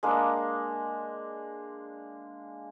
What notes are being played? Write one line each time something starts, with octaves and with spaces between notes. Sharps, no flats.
G#3 A#3 D4